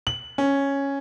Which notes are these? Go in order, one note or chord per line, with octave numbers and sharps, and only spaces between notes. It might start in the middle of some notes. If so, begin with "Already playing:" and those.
F#7
C#4